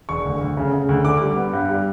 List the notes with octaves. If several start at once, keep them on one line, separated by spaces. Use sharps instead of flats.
E1 C#6
D2
D2
C#3
C#3
D2
D3 D6
G3
B3
G2
G3